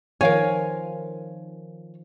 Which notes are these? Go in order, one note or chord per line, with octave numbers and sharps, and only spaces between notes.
D#3 F3 A#4 C#5 F5 G#5